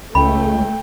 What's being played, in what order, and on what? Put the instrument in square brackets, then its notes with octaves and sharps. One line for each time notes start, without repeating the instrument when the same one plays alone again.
[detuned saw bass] C#2 [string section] A3 [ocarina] G5 [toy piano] B5